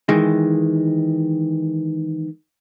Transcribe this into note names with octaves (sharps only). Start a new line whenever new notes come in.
D#3 E3 G#3